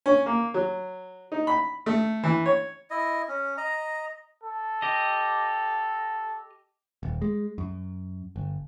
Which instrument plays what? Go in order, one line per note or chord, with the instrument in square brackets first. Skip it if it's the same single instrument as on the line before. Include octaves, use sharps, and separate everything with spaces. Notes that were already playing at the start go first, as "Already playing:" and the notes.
[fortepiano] C#4
A#3
F#3
D#4
B5
A3
E3
C#5
[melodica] E4 D#5
C#4
D#5 A#5
[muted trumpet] A4
[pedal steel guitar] G4 D#5
[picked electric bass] D#1
G#3
F#2
G1